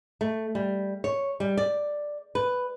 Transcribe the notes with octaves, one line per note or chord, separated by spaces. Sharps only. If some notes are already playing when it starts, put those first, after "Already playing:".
A3
G3
C#5
G3
D5
B4